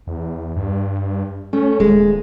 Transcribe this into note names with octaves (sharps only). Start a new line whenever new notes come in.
E2
G2
A3 C#4
D#1 G#3